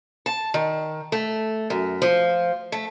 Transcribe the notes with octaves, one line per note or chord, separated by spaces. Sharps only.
A5
D#3
A3
F#2
F3
A3